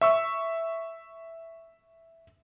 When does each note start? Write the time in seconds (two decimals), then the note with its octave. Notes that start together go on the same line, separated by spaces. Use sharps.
0.01 E5 C#6 E6